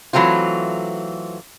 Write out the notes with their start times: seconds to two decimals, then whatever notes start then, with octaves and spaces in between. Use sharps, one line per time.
0.13 E3 F#3 A3 C4 F4